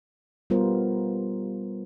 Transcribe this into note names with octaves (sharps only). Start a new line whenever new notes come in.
G3 B3 F4 A#4 C5